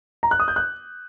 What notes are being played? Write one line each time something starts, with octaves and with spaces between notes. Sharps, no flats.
A#5
F#6
D#6
G6
F#6